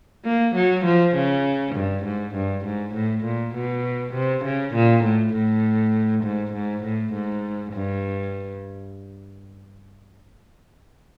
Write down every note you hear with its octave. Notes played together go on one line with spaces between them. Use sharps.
A#3
F#3
F3
C#3
G2
G#2
G2
G#2
A2
A#2
B2
C3
C#3
A#2
A2
A2
G#2
G#2
A2
G#2
G2